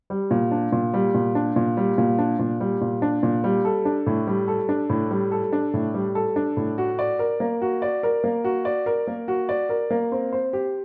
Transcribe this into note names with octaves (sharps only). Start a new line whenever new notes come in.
G3
A#2
D4
A#2
G3
A#2
D4
A#2
G3
A#2
D4
A#2
G3
A#2
D4
A#2
G3
A4
D4
A2
G3
A4
D4
A2
G3
A4
D4
A2
G3
A4
D4
A2
F#4
D5
A#4
A#3
F#4
D5
A#4
A#3
F#4
D5
A#4
A#3
F#4
D5
A#4
A#3
C4
C5
G4